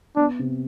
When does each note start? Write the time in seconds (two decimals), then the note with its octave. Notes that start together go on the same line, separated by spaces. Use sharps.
0.16 B3 D4
0.39 C3